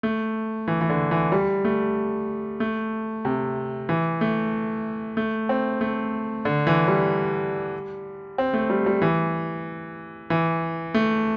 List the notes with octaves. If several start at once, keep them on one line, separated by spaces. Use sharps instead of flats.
A3
E3
E3
D3
E3
G3
A3
A3
C3
E3
A3
A3
C4
A3
D3
E3
G3
C4
A3
G3
G3
E3
E3
A3